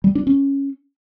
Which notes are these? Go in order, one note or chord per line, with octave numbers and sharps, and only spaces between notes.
G3
D4
C#4